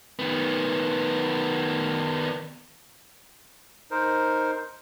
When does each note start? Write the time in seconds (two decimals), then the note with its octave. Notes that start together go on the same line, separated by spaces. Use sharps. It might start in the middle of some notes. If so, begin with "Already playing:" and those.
0.19 D#3 B3
3.91 D#4 A#4 C5